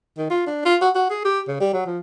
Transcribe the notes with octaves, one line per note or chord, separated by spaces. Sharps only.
D#3
F4
D4
F4
F#4
F#4
G#4
G4
C#3
G3
F#3
F3